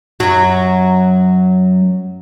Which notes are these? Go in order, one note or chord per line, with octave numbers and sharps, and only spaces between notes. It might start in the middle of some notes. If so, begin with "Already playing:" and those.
F#2 F#3